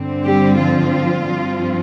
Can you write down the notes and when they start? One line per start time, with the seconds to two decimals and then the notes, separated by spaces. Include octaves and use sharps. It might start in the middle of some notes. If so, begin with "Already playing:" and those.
Already playing: G2 D3 C4
0.24 G3 G4
0.59 F3 F4
1.30 G2 F3 C4